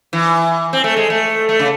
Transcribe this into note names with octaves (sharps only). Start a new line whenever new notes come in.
E3
C4
A3
G#3
A3
A3
C#3